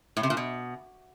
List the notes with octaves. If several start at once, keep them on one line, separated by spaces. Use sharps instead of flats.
A2
C3
A#2
B2